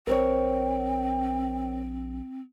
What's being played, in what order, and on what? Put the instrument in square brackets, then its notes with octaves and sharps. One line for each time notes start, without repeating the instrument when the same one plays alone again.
[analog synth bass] A#1 [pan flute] C4 [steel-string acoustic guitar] A#4 C5 C#5 [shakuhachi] G5